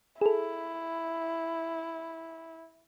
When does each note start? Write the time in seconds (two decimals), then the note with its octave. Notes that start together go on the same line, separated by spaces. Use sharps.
0.21 E4 G#4 A4